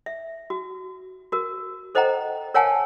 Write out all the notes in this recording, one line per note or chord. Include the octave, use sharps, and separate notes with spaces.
E5
F#4
F#4 A#4
A4 C5 D#5 F#5 G5 A#5
A#4 C#5 F5 F#5 G#5 A5